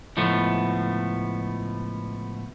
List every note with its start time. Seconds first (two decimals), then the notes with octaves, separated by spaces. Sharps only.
0.17 C#2 A2 F3 A3 B3